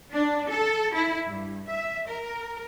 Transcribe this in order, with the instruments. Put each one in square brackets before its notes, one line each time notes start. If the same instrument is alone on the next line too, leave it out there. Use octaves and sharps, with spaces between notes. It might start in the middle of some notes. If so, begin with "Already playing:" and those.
[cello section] D4
A4
E4
G2
E5
A#4